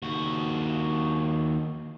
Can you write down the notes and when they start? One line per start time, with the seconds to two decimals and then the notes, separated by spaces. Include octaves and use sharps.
0.02 D#2 F#4